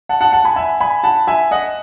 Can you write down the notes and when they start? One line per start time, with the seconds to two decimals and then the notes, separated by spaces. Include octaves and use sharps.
0.09 F#5 A5
0.21 F#5 A5
0.33 F#5 A5
0.45 G#5 B5
0.56 E5 G#5
0.81 G#5 B5
1.04 F#5 A5
1.27 E5 G#5
1.51 D#5 F#5